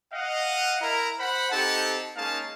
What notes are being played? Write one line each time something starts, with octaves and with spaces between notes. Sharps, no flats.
D#5 F5 F#5
E4 A#4 A#5
C5 F#5 B5
C4 D#4 G4 A4 F#5 A5
G#3 A#3 C#4 D#4 F5 A5